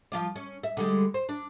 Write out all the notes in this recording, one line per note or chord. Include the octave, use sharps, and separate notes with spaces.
F3 F4 D5
C#4
E5
D3 G3 G#3
C5
D4